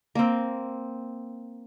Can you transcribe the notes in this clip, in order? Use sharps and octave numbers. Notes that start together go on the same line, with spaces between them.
A#3 C4